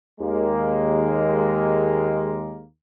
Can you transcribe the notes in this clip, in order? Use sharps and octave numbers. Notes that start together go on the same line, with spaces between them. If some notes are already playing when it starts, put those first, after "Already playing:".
D#2 G#3 A#3